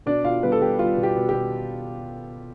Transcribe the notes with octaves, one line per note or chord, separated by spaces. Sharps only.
B2 D4 D5
B2 F4 F5
G3 B3 B4
A4
G3 G4
G3 F4
B2
G4
B2
G4
B2